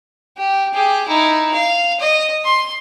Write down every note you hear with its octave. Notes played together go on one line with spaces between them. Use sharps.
G4
G4 G#4
D#4 E4
F5
D#5
C6